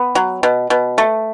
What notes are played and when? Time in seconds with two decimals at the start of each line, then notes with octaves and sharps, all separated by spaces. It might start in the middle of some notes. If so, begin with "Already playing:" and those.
Already playing: B3
0.15 F#3
0.43 B2
0.70 B2
0.98 A3